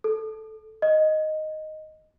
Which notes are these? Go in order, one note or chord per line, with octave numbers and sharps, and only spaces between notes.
A4
D#5